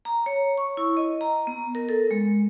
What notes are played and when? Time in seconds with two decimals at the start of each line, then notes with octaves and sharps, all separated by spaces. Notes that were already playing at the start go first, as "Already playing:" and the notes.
0.05 A#5
0.26 C#5
0.58 C#6
0.77 E4
0.97 D#5
1.21 A#5
1.47 B3
1.75 A#4
1.89 A4
2.11 G#3